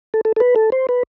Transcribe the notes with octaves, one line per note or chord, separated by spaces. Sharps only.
A4
A4
A4
B4
A4
C5
B4